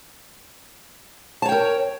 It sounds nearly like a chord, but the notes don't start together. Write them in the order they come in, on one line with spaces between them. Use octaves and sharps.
A5 C#5 G5 A#4